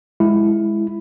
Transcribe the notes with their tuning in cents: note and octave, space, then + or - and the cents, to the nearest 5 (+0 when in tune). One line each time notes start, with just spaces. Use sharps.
G#3 +0 E4 +5